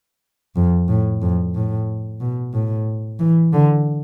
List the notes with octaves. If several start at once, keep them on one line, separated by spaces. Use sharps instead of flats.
F2
A2
F2
A2
B2
A2
E3
D3